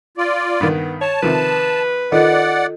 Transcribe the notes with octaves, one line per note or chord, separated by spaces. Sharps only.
F4 D5
G2 D#3 B3
C#5 A5
C3 D#3 F3 B4
D#3 F4 A4 D5 D#5 F#5